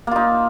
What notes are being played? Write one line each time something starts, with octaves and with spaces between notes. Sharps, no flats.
A#3 D#4 F4